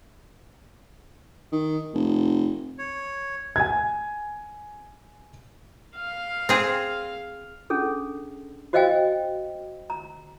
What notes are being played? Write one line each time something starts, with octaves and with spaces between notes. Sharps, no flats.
D#3
F1
C#5
G#5 G#6
F5
C4 G#4
C#4 D4 G#4 A4
F#4 C5 D#5 F5 G5 G#5
A#5